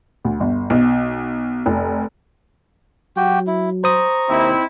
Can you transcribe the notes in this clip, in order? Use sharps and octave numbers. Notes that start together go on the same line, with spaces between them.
D2
G1
B1
F1
F#3 F#4 G4 G5
E4
C5 A#5 C#6 D#6
D#2 C4 D#4 E4